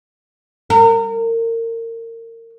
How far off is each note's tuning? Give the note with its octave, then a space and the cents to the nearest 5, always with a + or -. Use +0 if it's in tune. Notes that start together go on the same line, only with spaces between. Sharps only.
A#4 -30